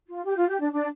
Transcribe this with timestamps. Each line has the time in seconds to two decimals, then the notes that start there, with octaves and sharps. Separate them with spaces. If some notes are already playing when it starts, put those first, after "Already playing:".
0.08 F4
0.25 G4
0.37 F4
0.49 G4
0.60 D4
0.73 D4